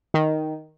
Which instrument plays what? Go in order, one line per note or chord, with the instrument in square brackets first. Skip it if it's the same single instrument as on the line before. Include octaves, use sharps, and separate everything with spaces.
[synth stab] D#3